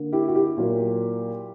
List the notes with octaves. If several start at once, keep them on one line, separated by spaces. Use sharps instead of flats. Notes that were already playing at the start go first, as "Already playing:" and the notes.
Already playing: D3 A#3
E4 G4
F#4
E4 G4
A#2 F#3 A#3